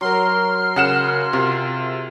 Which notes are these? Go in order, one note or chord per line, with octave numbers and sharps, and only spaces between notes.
F#3 A#4 C6 F6
C#3 G#4 F#5 E7
C3 F4